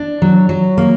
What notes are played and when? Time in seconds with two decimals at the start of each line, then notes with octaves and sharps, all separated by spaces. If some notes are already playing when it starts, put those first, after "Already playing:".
Already playing: D4
0.22 F#3
0.49 F#3
0.78 A#3